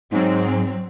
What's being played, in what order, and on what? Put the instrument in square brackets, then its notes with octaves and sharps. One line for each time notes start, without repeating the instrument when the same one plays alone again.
[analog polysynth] G#2 [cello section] F#3 C4